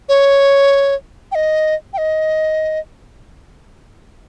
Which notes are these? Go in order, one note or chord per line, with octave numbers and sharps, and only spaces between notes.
C#5
G5
D#5
G5
D#5